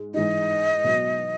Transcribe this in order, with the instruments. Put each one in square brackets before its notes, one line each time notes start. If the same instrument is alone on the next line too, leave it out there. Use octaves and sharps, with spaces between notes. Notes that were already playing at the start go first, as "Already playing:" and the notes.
Already playing: [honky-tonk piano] G#2 G#3
[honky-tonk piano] G#2 E3 G#3 D#4 [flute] D#5
[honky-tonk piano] B2 F#3 B3